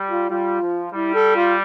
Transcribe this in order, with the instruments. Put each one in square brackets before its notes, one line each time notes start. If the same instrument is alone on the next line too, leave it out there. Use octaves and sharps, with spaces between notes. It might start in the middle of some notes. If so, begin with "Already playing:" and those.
Already playing: [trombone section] G3
[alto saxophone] F4
[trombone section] G3 [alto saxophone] F4
[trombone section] F3
[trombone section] G3 [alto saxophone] E4
[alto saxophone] A4
F4